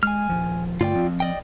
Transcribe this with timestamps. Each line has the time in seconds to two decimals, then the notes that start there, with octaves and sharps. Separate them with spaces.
0.03 G#3 G#5 F6
0.29 D#1 C#2 F3
0.81 G2 D3 A3 F4 D5 G5
0.95 F3 C4
1.20 D5 D#5 G5